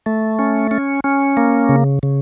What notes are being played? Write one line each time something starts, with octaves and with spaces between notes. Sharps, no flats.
A3
C#4
C#4
C#4
A#3
C#3
C#3